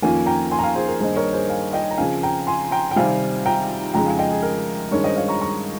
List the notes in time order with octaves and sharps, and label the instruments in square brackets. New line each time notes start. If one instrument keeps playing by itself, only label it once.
[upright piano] F2 D#3 A#3 C#4 F4 F5 G#5
G5 A#5
G#5 C6
A#5
F5 G#5
G#4 C5
A#4
G2 D#3 A#3 D#4 G#4 C5
A#4 C#5
G#4 C5
F5 G#5
D#5 G5
A#5
C#3 F3 C4 F5 G#5
G5 A#5
G#5 C6
G5 A#5
G5
C3 D#3 G3 C4 F5 G#5
G5 A#5
F2 C#3 G#3 D#4 G5 A#5
F5 G#5
D#5 G5
G#4
A#4
G2 D#3 G#3 C#4 A#4 C#5
C5 D#5
C#5 F5
A#5 C#6
A#5 C#6